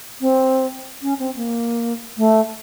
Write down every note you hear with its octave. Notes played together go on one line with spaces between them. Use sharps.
C4
C#4
C4
A#3
A3